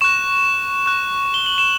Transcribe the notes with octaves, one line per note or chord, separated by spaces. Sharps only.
C#6 F#6 E7
C#6 F#6
G7
F#7
E7